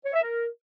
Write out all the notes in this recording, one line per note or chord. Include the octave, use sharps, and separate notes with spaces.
C#5
E5
A#4